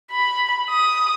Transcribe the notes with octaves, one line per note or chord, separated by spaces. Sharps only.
B5
D#6